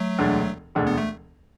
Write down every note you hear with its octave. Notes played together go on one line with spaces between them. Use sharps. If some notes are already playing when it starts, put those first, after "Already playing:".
Already playing: F#3 A3
E1 D2 D3 G#3 D4
E1 D2 D3 G#3 D4
B3
A3